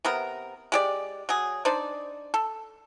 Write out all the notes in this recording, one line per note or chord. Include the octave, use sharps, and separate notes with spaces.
C3 B3 A#4
G#3 G4 D5
F#3 G#4
D4 D#4 C5 D5
A4